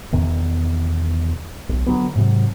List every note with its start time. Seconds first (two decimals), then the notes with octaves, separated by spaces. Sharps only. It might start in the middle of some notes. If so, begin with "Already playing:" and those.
0.12 E2 B2 D#3
1.69 B1
1.86 D3 F#3 B3
2.15 G#2 C3 F#3